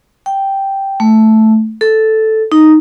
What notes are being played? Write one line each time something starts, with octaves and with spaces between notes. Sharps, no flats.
G5
A3
A4
D#4